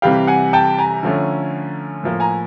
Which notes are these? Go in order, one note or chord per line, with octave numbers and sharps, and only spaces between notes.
C3 E3 G3 F5 G5
F#5 G#5
G5 A5
G#5 A#5
D3 F3 A3 C#4
A2 F3 A#3
G#5 A#5